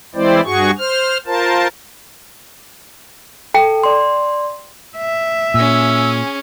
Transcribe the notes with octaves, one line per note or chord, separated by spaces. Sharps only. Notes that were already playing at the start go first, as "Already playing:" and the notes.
E3 G#3 C4 E4 C5 D5
G2 F#4 G#4 C#6
C5 F6
F4 A#4 C5 A5
A4 G5
D5 C6
E5
A#2 C#4 G#4 E6